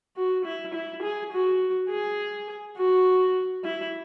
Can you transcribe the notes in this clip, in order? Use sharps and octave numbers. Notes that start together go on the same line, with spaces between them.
F#4
E4
E4
G#4
F#4
G#4
F#4
E4